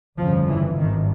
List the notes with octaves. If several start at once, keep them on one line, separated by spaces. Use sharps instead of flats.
G1 F2 C#3 F3
E3
G#1 G2 D#3